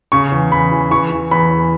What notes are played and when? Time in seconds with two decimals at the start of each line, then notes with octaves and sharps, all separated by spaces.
0.12 C#3 C#6
0.32 E2
0.51 E2 B5
0.71 E3
0.91 E3 C#6
1.12 E3
1.31 E2 B5
1.51 E2